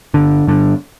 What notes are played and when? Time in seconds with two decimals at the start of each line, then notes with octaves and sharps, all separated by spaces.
0.14 G1 D3
0.47 G2 D3